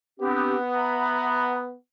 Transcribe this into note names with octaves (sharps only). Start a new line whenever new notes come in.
B3 C4 D4 G4
E5 A#5 B5